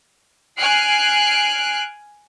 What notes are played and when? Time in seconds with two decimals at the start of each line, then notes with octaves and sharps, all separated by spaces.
0.59 G#5 F6 F#6 C7 D7